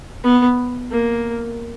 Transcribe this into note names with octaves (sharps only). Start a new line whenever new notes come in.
B3
A#3